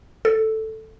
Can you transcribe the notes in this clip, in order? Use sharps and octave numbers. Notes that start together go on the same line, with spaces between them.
A4